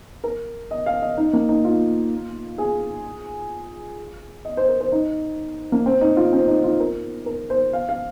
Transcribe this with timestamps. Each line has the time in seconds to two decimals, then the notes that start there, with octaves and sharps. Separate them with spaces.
0.24 A#4
0.71 D#5
0.86 F5
1.02 D#5
1.17 D#4
1.33 A#3
1.49 D#4
1.65 F4
2.58 G#4
4.45 D#5
4.57 C5
4.69 A#4
4.80 C5
4.92 D#4
5.72 A#3
5.86 C4
6.01 D#4
6.17 F4
6.33 C4
6.48 D#4
6.64 F4
6.80 A#4
7.26 A#4
7.50 C5
7.73 F5
7.89 F5